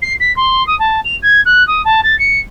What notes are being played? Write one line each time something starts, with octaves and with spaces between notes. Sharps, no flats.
C7
B6
C6
D#6
A5
F7
G#6
F#6
D#6
A5
A6
C#7